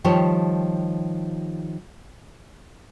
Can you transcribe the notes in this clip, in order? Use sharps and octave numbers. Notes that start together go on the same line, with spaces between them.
D#3 F3 G3 G4 C#5 A5